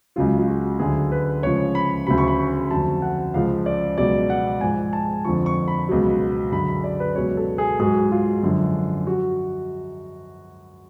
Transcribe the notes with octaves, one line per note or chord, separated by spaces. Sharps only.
C#2 C#3 F#3 F4
F4
F#4
D2 D3 F#3 G#4
B4
C#2 C#3 F3 C#5
B5
D2 C#3 F#3 B5
C#6
B5
C#6
F2 D3 F#3 A5
F#5
C#2 C#3 F3 F5
D5
C#2 B2 F#3 D5
F#5
G#2 F3 G#5
A5
F2 D3 F3 C#6
C#6
B5
C#2 B2 F#3
F#2 D3 F#3 B5
B5
D5
B4
C#2 B2 F#3 C#5
A4
G#4
G#2 F#3 G#4
F4
F#2 D3 F3
F#3 F#4